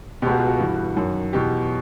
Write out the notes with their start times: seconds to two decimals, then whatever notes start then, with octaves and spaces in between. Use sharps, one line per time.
0.22 B2 G4
0.26 C#2 F#4
0.38 F4
0.47 F#4
0.59 G2 E3
0.96 F#2 D#3
1.33 E2 B2 G4